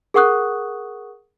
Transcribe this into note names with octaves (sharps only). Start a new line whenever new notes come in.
G#4 A#4 F#5 C#6 D#6 F#6